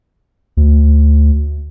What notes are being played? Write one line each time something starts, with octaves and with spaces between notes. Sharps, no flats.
D2